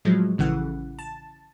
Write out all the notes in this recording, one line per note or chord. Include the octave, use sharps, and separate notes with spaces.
A2 F3 F#3 G#3
A1 C#3 E3 F#5
A5